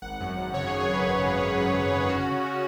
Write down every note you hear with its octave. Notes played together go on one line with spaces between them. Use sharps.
G#1 F#5
F#2
G#1
C#3 C#5
G#4
G#1
C#5
F#2 B4
G#1
C#3
G#1
F#2
G#1
C#3
C#4 F#4
C#3